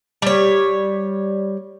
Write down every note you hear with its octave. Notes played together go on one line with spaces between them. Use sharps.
G3 C#5